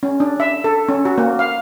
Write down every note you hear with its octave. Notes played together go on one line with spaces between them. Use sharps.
C#4
D4
E5
A4
C#4
F#4
A#3
F5